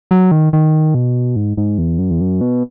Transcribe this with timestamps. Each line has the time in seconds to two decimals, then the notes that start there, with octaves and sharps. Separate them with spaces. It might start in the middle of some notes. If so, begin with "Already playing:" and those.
0.11 F#3
0.31 D#3
0.53 D#3
0.95 B2
1.36 G#2
1.57 G#2
1.78 E2
1.99 F#2
2.11 E2
2.21 F#2
2.41 B2